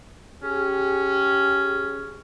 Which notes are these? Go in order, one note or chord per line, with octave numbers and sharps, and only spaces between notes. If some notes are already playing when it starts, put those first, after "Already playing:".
C#4 G4 G#4